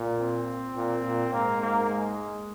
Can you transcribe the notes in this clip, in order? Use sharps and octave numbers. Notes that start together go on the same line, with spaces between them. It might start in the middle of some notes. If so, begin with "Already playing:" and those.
Already playing: A#2
C4
A#2
A#2
G#2 A#3
A#3
G#3